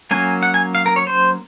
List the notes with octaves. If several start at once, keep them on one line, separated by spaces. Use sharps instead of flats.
F#3 A#3 C#4 G#5
F#5
G#5
F5
A#4
C#5
C5